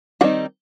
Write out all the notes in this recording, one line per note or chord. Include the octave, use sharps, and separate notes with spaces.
D#3 G3 C4 D#4 F#4